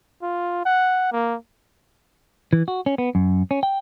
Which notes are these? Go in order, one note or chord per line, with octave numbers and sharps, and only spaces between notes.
F4
F#5
A#3
E3
F#4
C#4
B3
F#2
C#4
G5